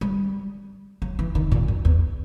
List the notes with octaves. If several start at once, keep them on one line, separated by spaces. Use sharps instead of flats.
G3
F#3
E3
D#3
A#2
F#2
E2